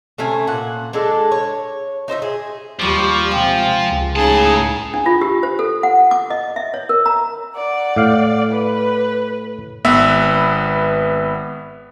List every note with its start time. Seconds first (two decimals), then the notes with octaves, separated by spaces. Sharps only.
0.18 C3 A3 C#4 G#5
0.47 A#2 F#5
0.93 G#3 D4 A4
1.32 C#5
2.08 D#4 C5 D#5 E5
2.22 G#4
2.80 D#2 F3 G3 B5 C#6 D6
3.31 C3 G#3 F5 G5
3.87 C#2
4.16 A2 C#3 D#4 G#4 A5 A#5
4.94 D4
5.06 F4
5.21 G4
5.43 C5
5.59 A4
5.83 F#5
6.11 D6
6.30 D#5
6.56 E5
6.74 C#5
6.89 A#4
7.06 A#5
7.56 D5 F#5
7.96 A2 F5
8.52 B4
9.85 G#1 B3 B4 E5